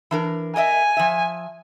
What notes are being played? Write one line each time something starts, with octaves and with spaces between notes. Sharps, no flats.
E3 D4 A#4
A#4 D#5 E5 G#5
F3 E5